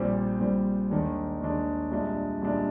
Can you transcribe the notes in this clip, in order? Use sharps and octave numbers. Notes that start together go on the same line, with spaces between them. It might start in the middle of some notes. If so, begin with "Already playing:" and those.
Already playing: A#1 A#2 G3 C4
A#1 A#2 G3 C4
D#2 D#3 G#3 D4
D#2 D#3 G#3 D4
C2 A#2 G#3 D4
C2 A#2 G#3 D4